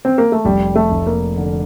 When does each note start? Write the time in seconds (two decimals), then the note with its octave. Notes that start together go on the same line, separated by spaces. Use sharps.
0.05 C4
0.18 A#3
0.32 A3
0.45 F1 G3
0.76 A3
0.92 F1
1.07 A#3
1.37 D3